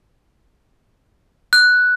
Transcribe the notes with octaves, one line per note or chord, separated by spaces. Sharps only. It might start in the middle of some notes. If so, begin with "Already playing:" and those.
F#6